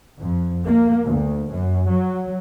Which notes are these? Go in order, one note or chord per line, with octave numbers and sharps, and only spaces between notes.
F2
A#3
D2
F#2
F#3